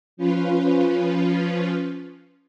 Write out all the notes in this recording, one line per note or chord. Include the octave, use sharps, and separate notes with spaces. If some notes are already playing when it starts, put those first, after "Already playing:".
F3 C#4 F4 B4